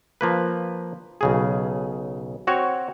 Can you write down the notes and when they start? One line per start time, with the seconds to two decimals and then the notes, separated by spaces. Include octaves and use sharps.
0.21 F3 A#3 B4
1.21 B1 C#3 G#4
2.47 C4 F#4 C#5